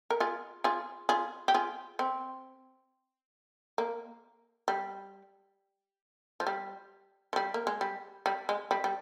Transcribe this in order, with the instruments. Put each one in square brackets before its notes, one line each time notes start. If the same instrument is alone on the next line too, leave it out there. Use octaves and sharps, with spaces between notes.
[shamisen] A#4
F4 G#4
F4 G#4
F4 G#4
G4
F4 G#4
C4
A#3
G3
F3
G3
F3
G3
A#3
G#3
G3
G3
G#3
G3
G3